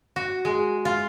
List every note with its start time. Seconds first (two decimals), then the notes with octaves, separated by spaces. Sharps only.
0.16 F#4
0.45 G#3
0.85 F4